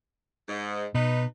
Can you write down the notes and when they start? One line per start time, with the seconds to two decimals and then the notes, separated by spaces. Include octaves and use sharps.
0.48 G#2
0.94 B2 D#4 B4